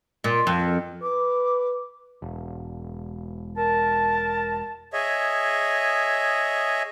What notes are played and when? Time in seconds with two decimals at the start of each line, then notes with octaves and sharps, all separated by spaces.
0.24 A#2
0.47 F2
1.02 B4 D6
2.22 E1
3.57 A#4 A5
4.93 G#4 C#5 D#5 E5